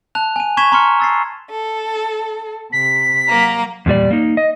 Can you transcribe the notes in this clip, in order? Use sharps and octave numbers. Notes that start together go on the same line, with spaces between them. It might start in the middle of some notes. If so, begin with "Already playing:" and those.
A5 F#6 F7
G#5 D#7
B5 C#6 G#6 B6 E7 G7
A#5 C6 C#6 F6 C#7
E6 A6 C7
A4
C3 B6
F#3 A#3 A#5
E2 A#2 G3 D5
A#3 D#4
D#5